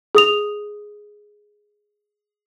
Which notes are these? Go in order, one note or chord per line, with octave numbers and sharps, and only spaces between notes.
G#4 D#6 F7